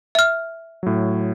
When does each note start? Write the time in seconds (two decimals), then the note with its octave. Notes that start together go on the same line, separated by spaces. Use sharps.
0.15 E5 F6
0.83 A2 F#3